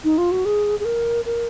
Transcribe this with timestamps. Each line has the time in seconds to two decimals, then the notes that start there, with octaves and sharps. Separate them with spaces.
0.04 D#4
0.18 F4
0.31 F#4
0.45 G#4
0.80 G#4
0.85 A#4
1.25 A#4